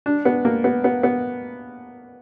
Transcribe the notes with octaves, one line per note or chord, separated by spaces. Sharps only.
D4
B3
A#3
B3
B3
B3